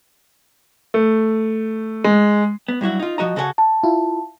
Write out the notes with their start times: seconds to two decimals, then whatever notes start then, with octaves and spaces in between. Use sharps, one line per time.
0.94 A3
2.04 G#3
2.68 B3
2.81 G2 F#3 E4 F#4
3.00 D#4 F4
3.18 F3 F#4 D#5 A#5
3.36 C#3 F#4 A4 A#4 F#5 G#5
3.58 A5
3.83 E4 F4